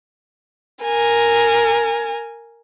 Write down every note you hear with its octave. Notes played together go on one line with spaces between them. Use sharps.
A#4 G#5